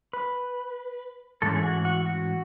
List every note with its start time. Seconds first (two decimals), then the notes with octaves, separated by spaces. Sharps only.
0.13 B4
1.42 G#2 E3 A3 C#4 A4
1.56 G#4
1.63 F#4
1.85 F#4
2.06 F#4